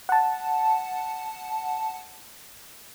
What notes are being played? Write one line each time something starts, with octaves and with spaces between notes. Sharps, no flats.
F#5 A5